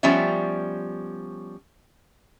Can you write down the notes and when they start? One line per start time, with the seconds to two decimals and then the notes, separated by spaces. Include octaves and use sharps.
0.03 F3 G3 B3 C#4 C#5 E5